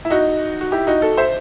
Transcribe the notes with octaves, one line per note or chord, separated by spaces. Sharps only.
E4
D#4 F#4
F#4
E4 G4
D#4 F#4
F#4 A4
C5 E5